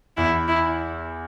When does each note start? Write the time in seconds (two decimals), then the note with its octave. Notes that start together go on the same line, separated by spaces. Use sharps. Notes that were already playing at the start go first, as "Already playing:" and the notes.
0.17 E2 E4
0.48 E4